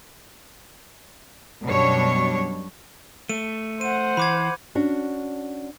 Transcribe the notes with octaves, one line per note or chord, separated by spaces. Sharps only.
F#2 B2 G3 D4 C#5
A3 D#7
C5 F#5 D#7
E3 B5 D6 G#6
C#4 D4 F#4